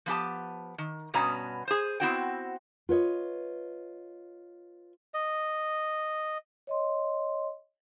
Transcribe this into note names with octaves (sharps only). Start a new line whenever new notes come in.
F3 B3 G4 A5
D#3
G2 B2 B3 C#4 F#4 A#5
G#4 C5
B3 C4 E4 F#4 C5 G5
F4 B4 C#5 D#5
D#5
C#5 D#5 C6